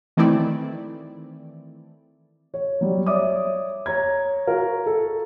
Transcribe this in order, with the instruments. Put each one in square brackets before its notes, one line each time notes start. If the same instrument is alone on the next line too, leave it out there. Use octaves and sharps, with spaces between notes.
[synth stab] D#3 E3 A3 C4 E4 D5
[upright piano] C#5
F#3 G3
C#5 D5 E5 D6 D#6
C#5 A#5 G#6
F4 F#4 A#4
A4